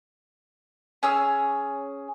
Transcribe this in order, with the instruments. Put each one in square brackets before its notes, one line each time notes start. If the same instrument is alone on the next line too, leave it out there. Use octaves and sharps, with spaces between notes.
[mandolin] C#4 G#4 E6